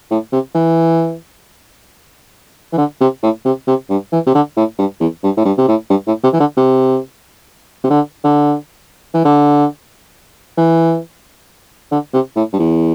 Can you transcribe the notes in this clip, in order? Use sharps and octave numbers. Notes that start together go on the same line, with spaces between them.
A2
C3
E3
E3
D3
C3
A2
C3
C3
G2
E3
C3
D3
A2
G2
E2
G2
A2
G2
C3
A2
G2
A2
C3
E3
D3
C3
C3
D3
D3
E3
D3
E3
D3
C3
A2
G2
E2